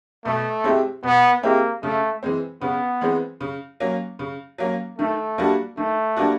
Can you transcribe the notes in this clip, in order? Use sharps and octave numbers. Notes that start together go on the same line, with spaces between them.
B2 A3
G#3 C4 E4 G4
B2 B3
G#3 A#3 C4 E4 G4
C#3 A3
E3 G#3 C4
C#3 B3
E3 G#3 C4
C#3
F#3 A#3 C#4
C#3
F#3 A#3 C#4
D#3 A3
G3 A#3 D4 F#4
D#3 A3
G3 A#3 D4 F#4